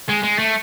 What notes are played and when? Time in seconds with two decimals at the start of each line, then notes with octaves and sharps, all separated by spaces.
0.09 G#3
0.23 G#3
0.39 A3